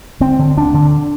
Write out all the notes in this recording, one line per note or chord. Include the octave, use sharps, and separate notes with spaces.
D3 C4
D3
D2 D4
D3